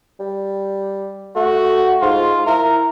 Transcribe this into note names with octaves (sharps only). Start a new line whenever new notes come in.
G3
A3 F#4
G#2 F4
E4 A#4